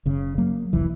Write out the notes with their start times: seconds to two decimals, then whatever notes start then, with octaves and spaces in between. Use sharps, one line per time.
0.05 F#1 C#3
0.38 F#3 A#3
0.73 F1 C2 E3